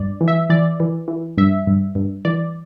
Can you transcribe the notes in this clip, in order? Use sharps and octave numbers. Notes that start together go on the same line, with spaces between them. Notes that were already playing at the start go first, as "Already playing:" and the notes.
Already playing: G2 D5
E3
E5
E3 D5
E3
E3
G2 E5
G2
G2
E3 D5